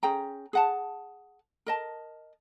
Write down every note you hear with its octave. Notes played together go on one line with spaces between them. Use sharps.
C#4 G#4 G5 A#5
G#4 F#5 A5
A#4 D#5 A5